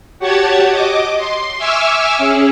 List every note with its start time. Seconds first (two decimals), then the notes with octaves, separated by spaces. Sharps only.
0.19 F#4 G4 C#5 F#5 A5 G#6
0.70 D#5 D6
1.17 C6
1.58 E5 G#5 C#6 D6 E6 F6
2.18 C#4 G#4